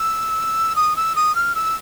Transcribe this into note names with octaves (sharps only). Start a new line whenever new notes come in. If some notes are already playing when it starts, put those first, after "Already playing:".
Already playing: E6
D#6
E6
D#6
F6
E6